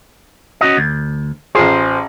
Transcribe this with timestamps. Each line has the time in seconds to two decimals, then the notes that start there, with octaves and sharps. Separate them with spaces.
0.61 C#4 F#4 D#5
0.77 D2
1.55 A1 F4 G#4 C5